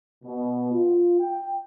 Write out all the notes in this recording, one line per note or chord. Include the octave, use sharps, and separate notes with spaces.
B2
F4
G5